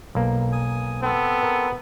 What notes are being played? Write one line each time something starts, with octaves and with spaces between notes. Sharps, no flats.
B1 A#3
G#5 D#6
B3 C4 A4
A#4